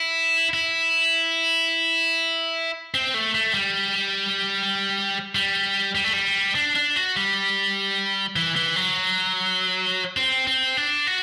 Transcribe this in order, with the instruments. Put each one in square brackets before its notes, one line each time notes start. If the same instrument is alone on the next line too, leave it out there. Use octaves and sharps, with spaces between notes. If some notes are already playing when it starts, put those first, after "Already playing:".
Already playing: [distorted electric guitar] E4
E4
C4
A3
A3
G3
G3
G3
A3
G3
D4
D4
F#4
G3
E3
E3
F#3
C4
C4
D4
F#4